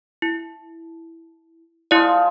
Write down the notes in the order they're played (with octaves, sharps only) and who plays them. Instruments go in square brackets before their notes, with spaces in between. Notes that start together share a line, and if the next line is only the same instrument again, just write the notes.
[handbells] E4
[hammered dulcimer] F3 G#3 F4 [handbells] E4 D5